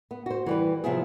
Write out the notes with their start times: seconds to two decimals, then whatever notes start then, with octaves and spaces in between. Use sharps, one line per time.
0.11 B3
0.26 F#4 C5
0.46 E3 G3 B4
0.84 C3 F3 F#3 B3 E4 G#4